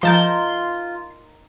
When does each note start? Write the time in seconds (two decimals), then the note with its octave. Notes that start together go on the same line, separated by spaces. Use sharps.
0.03 F3 D#4 F4 A#4 A5 C6 G6